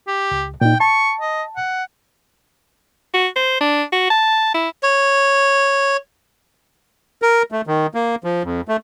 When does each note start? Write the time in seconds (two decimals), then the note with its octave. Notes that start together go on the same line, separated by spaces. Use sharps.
0.07 G4
0.31 C#2
0.61 A#2 D#4 G5
0.80 A5 C#6
1.21 D#5
1.57 F#5
3.14 F#4
3.36 C5
3.60 D4
3.93 F#4
4.10 A5
4.54 E4
4.83 C#5
7.22 A#4
7.52 A3
7.67 D#3
7.95 A#3
8.24 F3
8.44 F2
8.68 A3